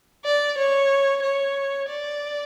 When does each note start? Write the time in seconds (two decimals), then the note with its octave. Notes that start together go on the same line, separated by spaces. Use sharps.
0.25 D5
0.58 C#5
1.23 C#5
1.89 D5